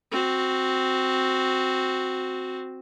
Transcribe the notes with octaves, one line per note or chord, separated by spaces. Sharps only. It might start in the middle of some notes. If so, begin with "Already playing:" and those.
C4 F#4